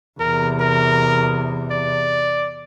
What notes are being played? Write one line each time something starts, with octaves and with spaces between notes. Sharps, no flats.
E2 C3 A#4
A#4
D5